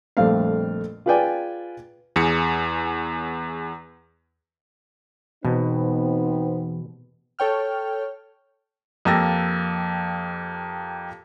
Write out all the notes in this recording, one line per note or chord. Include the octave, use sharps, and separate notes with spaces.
A#1 F2 G3 A3 C4 F5
F4 G#4 B4 D5 G5 G#5
E2 G#4 C#7
E2 B2 B3 C4 D#4
A4 C#5 G5 F6
F2 A#3 G4 E6 A6 A#6